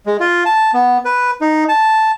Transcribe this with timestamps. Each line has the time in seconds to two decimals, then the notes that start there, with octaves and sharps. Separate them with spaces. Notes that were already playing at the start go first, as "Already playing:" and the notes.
0.06 G#3
0.20 F4
0.46 A5
0.74 B3
1.05 B4
1.41 D#4
1.69 A5